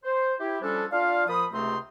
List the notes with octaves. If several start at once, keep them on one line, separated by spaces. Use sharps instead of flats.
C5
E4 G4
F3 G3 C#4 D4 A4
D4 F4 D5 F5
A#2 F3 B5 D#6
C#2 C3 A3 C4 D#4 C6